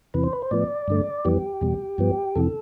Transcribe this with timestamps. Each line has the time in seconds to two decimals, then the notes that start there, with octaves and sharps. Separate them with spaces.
0.14 E2 C3 E3 B4
0.23 C5
0.33 B4
0.42 C5
0.51 A2 F3 B3 D5
0.88 G2 D3 A3
1.25 F2 E3 G3 B3 G4
1.61 E2 B2 G3
1.98 G2 F3 B3
2.35 F2 C3 E3 A4